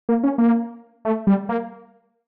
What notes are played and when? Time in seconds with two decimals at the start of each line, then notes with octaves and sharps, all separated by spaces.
0.09 A#3
0.23 C#4
0.38 A#3
1.05 A3
1.27 G3
1.49 A#3